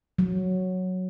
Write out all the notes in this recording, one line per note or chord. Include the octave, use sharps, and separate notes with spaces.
F#3